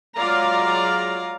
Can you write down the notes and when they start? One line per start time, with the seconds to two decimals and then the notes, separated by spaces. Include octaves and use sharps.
0.17 F#3 G#3 F4 D5 F5 A#5